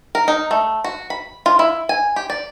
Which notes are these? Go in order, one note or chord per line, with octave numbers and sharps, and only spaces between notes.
A#4
D#4
A3
F#4
B5
F4
E4
G#5
G4
D5